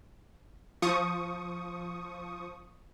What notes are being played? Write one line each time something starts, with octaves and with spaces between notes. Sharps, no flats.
F3 C#6 D#6